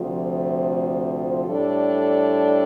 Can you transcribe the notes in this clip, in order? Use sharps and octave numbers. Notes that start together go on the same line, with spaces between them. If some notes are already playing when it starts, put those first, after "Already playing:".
Already playing: D2 C3 F3 A3
A2 G3 D4 A4